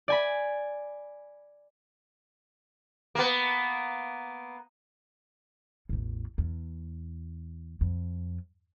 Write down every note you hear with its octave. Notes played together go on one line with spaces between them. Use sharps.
D5 G#5 B5
A#3 B3
A1 E2
E2
F2